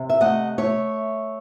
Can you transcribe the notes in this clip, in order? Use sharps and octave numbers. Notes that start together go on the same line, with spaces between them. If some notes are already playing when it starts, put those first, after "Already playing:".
Already playing: C3
E5
A3 D#5 F#5
A3 C#5 E5